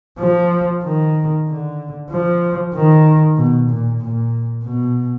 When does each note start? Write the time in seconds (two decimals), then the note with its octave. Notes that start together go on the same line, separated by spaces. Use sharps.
0.20 F3
0.84 D#3
1.48 D3
2.11 F3
2.74 D#3
3.37 B2
3.70 A#2
4.01 A#2
4.64 B2